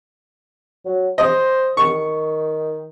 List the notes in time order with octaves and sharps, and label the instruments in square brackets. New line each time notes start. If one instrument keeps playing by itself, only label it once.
[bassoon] F#3
[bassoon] C5 [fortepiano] D#5
[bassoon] D#3 [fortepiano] C#6